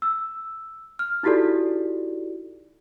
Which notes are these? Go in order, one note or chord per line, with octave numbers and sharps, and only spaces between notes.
E6
F6
D#4 E4 F#4 G4 A4 D5